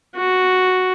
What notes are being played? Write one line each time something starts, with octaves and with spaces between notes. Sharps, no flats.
F#4